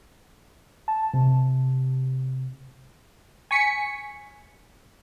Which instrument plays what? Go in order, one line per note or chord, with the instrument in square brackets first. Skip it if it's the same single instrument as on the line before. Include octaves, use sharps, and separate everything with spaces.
[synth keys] A5
C3
[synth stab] G#5 C#6 B6 C#7